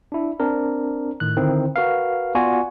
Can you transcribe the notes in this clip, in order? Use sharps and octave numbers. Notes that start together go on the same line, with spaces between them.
D4 E4
C4 D4 A#4
A2 D#3 F#6
D3 D#3 C4 E4
F#4 A#4 B4 F5
B3 F4 F#4 D5 G#5